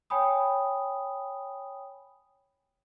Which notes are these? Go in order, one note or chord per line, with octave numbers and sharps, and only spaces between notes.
C#5 G5 G#5 B5 D#6